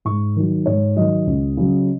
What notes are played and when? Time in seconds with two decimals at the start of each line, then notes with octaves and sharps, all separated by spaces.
0.05 G#2 C#6
0.36 D#3 F#3
0.66 G#2 C#5
0.96 D#3 F#3 D#5
1.27 C#2
1.57 C#3 F#3